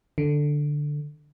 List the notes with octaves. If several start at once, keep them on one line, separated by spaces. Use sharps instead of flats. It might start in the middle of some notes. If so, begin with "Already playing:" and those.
D3